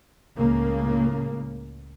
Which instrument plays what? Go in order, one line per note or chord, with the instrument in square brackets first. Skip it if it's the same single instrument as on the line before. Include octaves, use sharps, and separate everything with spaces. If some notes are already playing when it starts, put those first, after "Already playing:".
[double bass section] C#2 A2 C#3 A#3